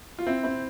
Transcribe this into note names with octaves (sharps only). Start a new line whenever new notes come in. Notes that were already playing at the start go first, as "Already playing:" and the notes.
F4
C4 E4
C4 E4